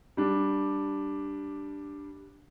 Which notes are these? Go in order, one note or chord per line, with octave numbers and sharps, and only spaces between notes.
G3 D4